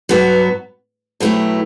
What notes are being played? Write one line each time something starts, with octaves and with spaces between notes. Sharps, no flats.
G2 F#3 B3 F#4
B2 F#3 A3 E4 G4